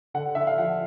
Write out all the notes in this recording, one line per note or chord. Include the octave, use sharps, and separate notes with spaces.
D3 F#5
D3 E5
F5
F3 F#5